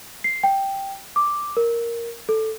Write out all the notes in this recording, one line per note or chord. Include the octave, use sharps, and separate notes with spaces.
C7
G5
D6
A#4
A4